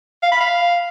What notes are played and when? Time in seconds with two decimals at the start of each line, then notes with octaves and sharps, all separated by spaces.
0.23 F5
0.32 B5
0.41 F5